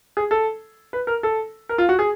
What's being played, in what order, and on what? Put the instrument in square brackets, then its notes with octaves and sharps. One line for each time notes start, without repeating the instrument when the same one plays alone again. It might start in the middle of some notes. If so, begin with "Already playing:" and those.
[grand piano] G#4
A4
B4
A#4
A4
A#4
F4
F#4
G#4